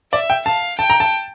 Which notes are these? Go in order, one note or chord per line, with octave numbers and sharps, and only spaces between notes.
D5 E5
G5
F5 A5
G5 A5
A#5
A5